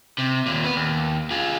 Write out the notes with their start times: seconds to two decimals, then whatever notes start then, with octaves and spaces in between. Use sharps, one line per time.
0.18 C3
0.46 D#2 A#2
0.64 B3 B4
0.76 D#2
1.31 F4 G#4